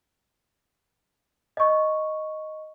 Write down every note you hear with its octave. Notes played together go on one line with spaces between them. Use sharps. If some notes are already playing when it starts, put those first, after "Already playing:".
D#5 C#6